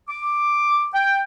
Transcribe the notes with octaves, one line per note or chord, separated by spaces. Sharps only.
D6
G5